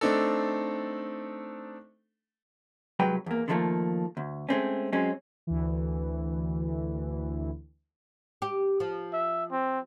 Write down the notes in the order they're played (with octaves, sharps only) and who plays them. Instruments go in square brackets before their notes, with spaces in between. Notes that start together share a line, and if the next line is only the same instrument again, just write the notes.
[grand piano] A3 C4 D4 D#4 A4
[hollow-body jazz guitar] C2 F#3 G#3 B4 G5
E2 A#3
D3 D#3 F3 G3 A3 A#3
D2
G#3 A3 C4 C#4
F#3 G#3 C4 C#4
[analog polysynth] D2 E3
[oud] G4
F3
[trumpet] E5
C4